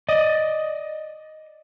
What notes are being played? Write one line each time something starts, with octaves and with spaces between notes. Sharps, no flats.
D5 D#5